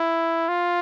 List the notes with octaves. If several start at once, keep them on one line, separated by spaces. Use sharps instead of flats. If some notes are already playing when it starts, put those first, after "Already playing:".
Already playing: E4
F4